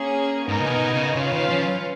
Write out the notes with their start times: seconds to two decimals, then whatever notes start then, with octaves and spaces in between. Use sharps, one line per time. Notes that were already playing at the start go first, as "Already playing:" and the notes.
Already playing: A#3 C#4 G#4
0.48 G#2 B3 D#4 A#4 D#5 G#5
0.60 C#3
0.70 B2
0.93 C#3
1.15 C#3 C#4 F4 B4 F5
1.33 D#3
1.50 F3